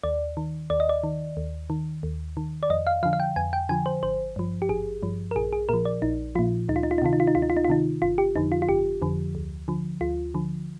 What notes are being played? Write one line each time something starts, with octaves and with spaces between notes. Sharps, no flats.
D#2 D5
D#3
D#2 D5
D#5
D5
D#3
D#2
D#3
D#2
D#3
D5
F2 D#5
F5
D3 F3 F5
F5
G5
F2 G#5
G5
D3 F3 G#5
C5
G#1 C5
G2 F3
G4
G#1 G#4
G2 F3
A#4
A#1 G#4
G#4
A#2 F3 A#4
D5
A#1 D#4
A#2 F3 F4
D2 D#4
F4
D#4
F4
D#4
C3 D#3 F4
D#4
F4
D#4
D2 F4
D#4
F4
D#4
F4
C3 D#3 D#4
G1 F4
G4
F2 D3 F3 D#4
F4
F4
G1 G4
F2 D3 F3
D2
D3 F3
D2 F4
D3 F3